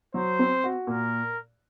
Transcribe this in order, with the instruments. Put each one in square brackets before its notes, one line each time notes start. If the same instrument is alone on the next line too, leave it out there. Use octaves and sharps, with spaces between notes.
[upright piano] F#3 [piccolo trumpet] C5
[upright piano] C4
F#4
[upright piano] A#2 [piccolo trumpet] A#4